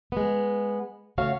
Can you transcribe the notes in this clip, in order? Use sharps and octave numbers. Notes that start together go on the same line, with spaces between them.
G#3 B3
C#3 A3 F#4 C#5 F5